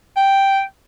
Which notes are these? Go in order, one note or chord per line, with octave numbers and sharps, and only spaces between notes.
G5